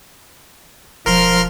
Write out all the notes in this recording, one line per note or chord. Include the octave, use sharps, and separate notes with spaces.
E1 F3 A#4 C6 F6